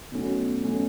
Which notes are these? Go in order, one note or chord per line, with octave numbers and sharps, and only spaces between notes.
B2 F#3 A3 C#4 F#4
B2 F#3 A3 C#4 F#4